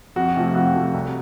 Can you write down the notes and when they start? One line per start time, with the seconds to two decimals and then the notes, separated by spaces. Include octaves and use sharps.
0.16 F2 F#4
0.36 C3 F3 A3
0.55 F2 F#4
0.75 C3 F3 A3
0.94 C2